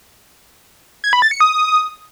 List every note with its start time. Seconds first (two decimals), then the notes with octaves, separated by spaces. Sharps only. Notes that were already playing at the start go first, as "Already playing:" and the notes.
1.04 G#6
1.13 B5
1.22 A6
1.31 C#7
1.40 D#6